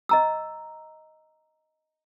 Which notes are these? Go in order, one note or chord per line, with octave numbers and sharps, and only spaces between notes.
D#5 A#5 E6